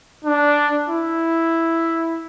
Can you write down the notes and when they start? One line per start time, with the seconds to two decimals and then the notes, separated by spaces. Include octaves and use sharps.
0.25 D4
0.89 E4